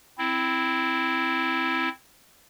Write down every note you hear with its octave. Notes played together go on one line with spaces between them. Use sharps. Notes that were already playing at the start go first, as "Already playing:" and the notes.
C4 E4